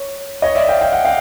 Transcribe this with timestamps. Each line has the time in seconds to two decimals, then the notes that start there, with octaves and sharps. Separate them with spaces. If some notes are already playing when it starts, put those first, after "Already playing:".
Already playing: C#5
0.42 C#5 D#5
0.55 D5 E5
0.68 F5 G5
0.81 G5
0.92 F#5
1.05 F5 G5